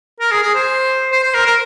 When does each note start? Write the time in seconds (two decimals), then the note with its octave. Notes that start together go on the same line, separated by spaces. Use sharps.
0.20 A#4
0.31 G#4
0.43 G#4
0.55 C5
1.12 C5
1.23 C5
1.34 A#4
1.46 A#4